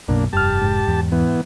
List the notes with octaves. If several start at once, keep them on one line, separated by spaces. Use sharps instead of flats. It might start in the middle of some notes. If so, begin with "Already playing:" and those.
B1 F#2 B2 A#3 D4
F1 G2 G4 A5 F6
G#2
E2
E3 B3